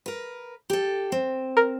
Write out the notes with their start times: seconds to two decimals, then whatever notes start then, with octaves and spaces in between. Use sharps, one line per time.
0.06 A#4 B4
0.70 G4 A4
1.12 C4
1.57 A#4